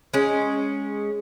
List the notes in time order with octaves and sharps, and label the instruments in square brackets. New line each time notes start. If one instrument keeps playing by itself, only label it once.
[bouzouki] G#3 C#4